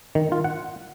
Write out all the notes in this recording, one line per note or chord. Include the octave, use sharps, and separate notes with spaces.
D#3
F4
F#5